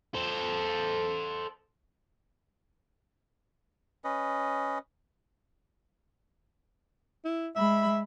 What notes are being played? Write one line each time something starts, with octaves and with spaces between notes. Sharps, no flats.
A4 C5
C#4 B4 D#5
E4
G#3 E5 B5